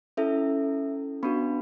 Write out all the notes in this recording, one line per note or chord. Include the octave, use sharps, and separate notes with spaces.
C#4 E4 A4 E5
B3 D4 F#4 B5